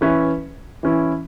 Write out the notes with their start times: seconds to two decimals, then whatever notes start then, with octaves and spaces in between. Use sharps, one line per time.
0.01 E3 C#4 E4 B4 E5
0.83 E3 C#4 E4